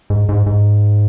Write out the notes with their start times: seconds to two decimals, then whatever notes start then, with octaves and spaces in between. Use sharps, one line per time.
0.10 G#2
0.29 G#2
0.46 G#2